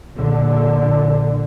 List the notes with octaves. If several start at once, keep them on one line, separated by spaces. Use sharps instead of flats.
A#1 D3